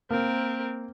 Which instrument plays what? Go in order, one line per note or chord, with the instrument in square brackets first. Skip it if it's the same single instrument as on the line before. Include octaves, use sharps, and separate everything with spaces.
[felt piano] A#3 [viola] C4 A#4